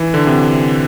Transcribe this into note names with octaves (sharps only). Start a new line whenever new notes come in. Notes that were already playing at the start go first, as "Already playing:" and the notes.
Already playing: E3
D3
C3